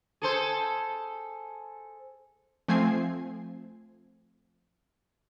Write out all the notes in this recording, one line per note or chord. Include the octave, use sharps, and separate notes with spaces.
G#4 A4 C5
F3 A3 C4 G#5 G#6 C7